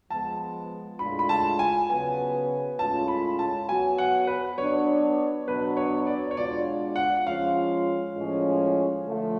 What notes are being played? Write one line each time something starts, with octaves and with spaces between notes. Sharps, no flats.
F3 G#3 B3 A5
A2 G#3 D4 F4 B5
B5
A5
G#5
C#3 F#3 B3 G#5
A2 G#3 C#4 F4 A5
B5
A5
F#3 B3 F#4 G#5
F#5
B4
F#3 B3 D4 C#5
B2 F#3 B3 D4 F#4 B4
C#5
D5
C#5
B2 G#3 D4 F4 D5
F#5
F3 G#3 C#4 F4 F5
A2 F3 G#3 C#4
D3 F3 A3 F4